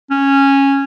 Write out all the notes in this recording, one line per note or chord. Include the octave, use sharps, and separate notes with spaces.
C#4